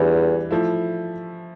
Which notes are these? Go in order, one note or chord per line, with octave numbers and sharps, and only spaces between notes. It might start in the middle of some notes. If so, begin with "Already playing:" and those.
Already playing: E2 E3 G3 D4 G4
F3 A3 E4